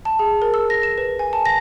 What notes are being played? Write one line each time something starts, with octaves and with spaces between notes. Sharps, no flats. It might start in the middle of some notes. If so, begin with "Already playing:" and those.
A5
G#4
A#4
E6
A#6
E7
B4
G#5
A5
A#6